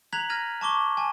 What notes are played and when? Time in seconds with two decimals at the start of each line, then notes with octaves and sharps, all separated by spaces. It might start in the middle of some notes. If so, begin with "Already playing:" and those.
0.13 A#5 F#6 G#6 B6 F7 F#7
0.29 F6 G#6 A#6 D#7
0.61 A5 C#6 D6 G7
0.97 G#5 A5